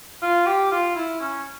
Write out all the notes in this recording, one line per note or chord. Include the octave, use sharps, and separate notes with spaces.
F4
G4
F4
E4
C#4